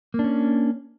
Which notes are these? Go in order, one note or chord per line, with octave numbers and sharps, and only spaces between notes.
A#3 C#4 D4